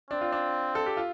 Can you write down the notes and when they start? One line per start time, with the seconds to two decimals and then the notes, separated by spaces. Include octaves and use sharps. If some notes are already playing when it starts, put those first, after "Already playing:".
0.11 C4 D4
0.21 F4
0.32 D4
0.75 A4
0.86 G4
0.97 F4